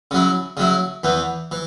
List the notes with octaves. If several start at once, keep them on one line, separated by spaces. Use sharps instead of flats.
C#3 F#3 E4
C#3 F#3 E4
E2 E3 B3
E3